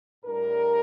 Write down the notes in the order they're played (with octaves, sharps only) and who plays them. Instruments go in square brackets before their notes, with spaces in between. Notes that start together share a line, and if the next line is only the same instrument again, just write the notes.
[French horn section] A2 G3 D4 A#4